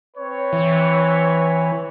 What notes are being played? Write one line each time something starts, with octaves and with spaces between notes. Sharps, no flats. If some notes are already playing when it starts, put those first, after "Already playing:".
C4 B4 C#5
E3